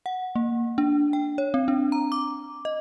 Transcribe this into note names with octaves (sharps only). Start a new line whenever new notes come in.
F#5
A#3
D4
G5
C#5
C4
D4
A#5
D6
D#5